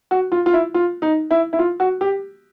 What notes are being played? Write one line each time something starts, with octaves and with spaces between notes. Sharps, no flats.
F#4
F4
F4
E4
F4
D#4
E4
E4
F4
F#4
G4